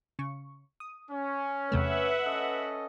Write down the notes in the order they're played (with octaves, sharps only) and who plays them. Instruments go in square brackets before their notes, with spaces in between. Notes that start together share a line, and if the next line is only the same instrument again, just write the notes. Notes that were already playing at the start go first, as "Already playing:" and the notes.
[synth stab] C#3 C#6
D#6
[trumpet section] C#4
[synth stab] E2 C3 A3 [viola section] B4 E5 F#5
[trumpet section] C#4 A4 D#5